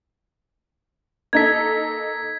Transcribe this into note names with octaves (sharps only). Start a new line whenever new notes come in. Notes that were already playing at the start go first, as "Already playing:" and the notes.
A#3 D#4 A4 G#6 B6